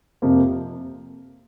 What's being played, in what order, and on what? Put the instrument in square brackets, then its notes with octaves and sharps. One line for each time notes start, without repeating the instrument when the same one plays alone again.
[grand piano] F2 C3 F3 A#3